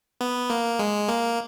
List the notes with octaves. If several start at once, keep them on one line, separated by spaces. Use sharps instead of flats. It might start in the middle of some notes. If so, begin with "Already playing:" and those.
B3
A#3
G#3
A#3